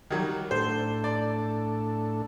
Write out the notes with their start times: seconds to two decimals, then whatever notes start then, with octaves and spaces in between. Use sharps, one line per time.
0.11 D#3 F#3 G3
0.51 A2 D4 A4 C5
1.04 D5